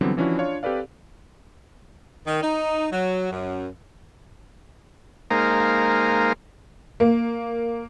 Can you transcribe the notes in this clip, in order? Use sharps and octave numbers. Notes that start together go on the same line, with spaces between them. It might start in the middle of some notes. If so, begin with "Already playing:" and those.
D3 E3 F#3 G3 B3 C4
E3 F3 C#4 D4 E4 F#4
D4 F4 C#5 F5 C#6
C4 G4 A4 B4 D5 F5
D#3
D#4
F#3
F#2
G#3 A#3 D#4 A#4 C5 F5
A#3